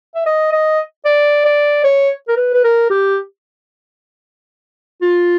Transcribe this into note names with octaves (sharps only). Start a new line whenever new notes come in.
E5
D#5
D#5
D5
D5
C#5
A#4
B4
B4
A#4
G4
F4